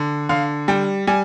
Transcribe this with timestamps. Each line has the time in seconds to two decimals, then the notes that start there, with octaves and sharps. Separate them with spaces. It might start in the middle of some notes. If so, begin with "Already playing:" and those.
Already playing: D3
0.29 D3 F5
0.68 G3 G5
1.07 G3 G#5